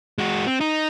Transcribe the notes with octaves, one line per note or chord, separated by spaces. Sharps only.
G#3 F#4
C4
D#4